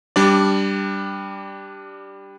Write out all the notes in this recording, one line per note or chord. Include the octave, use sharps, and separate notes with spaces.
G3 D4 D5